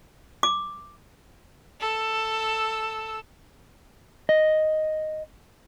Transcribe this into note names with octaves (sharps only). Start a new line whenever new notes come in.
D6
A4 E6
D#5